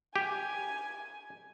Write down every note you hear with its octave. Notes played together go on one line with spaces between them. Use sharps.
G4 G#5